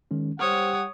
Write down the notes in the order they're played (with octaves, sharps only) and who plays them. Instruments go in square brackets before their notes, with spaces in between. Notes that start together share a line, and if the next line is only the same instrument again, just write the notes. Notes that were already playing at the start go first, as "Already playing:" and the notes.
[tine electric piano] D#3 G#3 C#4
[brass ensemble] G3 G4 F#5 [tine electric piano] C5 F6 [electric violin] C#5 D#6